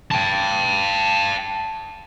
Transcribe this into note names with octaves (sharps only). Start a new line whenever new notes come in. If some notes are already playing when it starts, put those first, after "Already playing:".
G5 A5